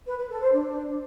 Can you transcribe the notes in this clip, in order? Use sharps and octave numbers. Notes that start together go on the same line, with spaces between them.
B4
B4
A4
C5
D4